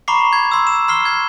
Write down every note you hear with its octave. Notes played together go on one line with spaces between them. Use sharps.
A#5 B5 C#6 D6 C7
G#6
C6 E6
E7
C6 F6 C7 G7
G#6